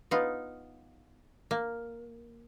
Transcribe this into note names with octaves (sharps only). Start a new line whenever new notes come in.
B3 D#4 F4
A#3